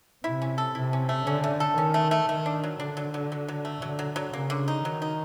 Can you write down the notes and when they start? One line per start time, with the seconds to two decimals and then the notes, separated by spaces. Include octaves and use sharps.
0.24 C3 E4
0.42 C#4
0.58 A4
0.75 C3 E4
0.93 C#4
1.09 A3
1.26 D3 C#4
1.44 A3
1.60 A4
1.77 D#3 C#4
1.94 A3
2.11 A3
2.29 D#3 A3
2.46 D4
2.64 F#3
2.80 D3 D4
2.97 F#3
3.14 F#3
3.32 F#3
3.48 F#3
3.65 A3
3.82 D3 F#3
3.99 F#3
4.16 F#3
4.33 C#3 A#3
4.50 D3
4.68 D#4
4.84 D#3 F#3
5.02 D#4